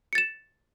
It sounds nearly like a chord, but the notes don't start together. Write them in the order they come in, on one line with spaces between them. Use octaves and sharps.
C#7 A6 E7